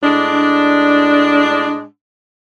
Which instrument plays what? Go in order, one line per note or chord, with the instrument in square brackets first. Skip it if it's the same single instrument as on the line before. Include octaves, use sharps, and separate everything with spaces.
[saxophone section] A2 G#3 D4